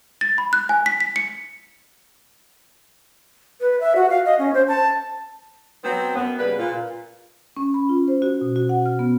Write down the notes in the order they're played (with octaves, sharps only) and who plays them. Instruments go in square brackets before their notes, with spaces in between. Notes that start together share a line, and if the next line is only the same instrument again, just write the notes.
[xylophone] A6
B5
F#6
G#5
B6
B6
C#7
[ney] B4
E5
F#4
F5
D#5
C#4
C5
A5
[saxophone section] F#3 B3 C4
F#2 B3
C#3 G3 A#3 B4
A#2 F4
[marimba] C#4
B5
F4
C5
F#4
B2
F#4
F#5
F6
B3